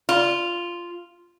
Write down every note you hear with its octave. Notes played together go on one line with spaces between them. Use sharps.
F4